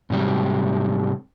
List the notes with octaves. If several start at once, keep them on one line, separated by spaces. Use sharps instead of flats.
G#2 C3 F#3 G3